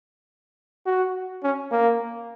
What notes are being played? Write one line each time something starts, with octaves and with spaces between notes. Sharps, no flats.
F#4
C#4
A#3